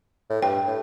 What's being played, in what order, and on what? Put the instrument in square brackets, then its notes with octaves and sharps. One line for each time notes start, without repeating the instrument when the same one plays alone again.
[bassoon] A2
[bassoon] G2 [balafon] G5
[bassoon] A2